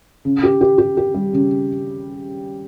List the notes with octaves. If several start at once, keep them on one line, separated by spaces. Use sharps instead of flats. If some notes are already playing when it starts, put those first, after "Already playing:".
C#3
G4
G4
G4
G4
G3
C#3